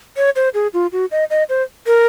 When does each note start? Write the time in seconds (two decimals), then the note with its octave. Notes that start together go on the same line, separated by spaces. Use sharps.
0.17 C#5
0.36 C5
0.54 G#4
0.74 F4
0.92 F#4
1.11 D#5
1.30 D#5
1.49 C5
1.87 A#4